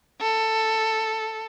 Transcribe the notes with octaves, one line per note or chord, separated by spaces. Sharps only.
A4